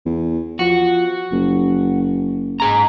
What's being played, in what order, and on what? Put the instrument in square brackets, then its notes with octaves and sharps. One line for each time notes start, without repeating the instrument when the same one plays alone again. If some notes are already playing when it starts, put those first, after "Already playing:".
[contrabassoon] E2
[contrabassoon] F3 [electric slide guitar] F#4
[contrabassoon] F#1
[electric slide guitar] G#2 G#4 A#5